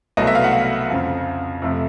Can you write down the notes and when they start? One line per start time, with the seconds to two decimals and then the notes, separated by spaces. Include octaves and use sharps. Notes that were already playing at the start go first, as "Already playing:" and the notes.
0.17 C2 B2 F#3 A3 D#5
0.27 E5
0.35 F5
0.44 F#5
0.53 F5
0.90 F2 C#3 F3
1.62 F2 C3 F3 A3